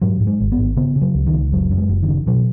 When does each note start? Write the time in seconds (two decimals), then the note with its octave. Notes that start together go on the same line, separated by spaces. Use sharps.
0.02 G#2 F#3
0.20 G#2
0.27 G#3
0.40 G#1
0.52 B3
0.59 G#1
0.76 C#3 B3
0.96 C#3
1.01 F#3
1.14 C#2
1.27 D#3
1.33 C#2
1.52 F#1 F#3
1.71 F#2
1.78 G#3
1.89 F#1
2.03 D#3
2.08 C#3
2.27 B2 F#3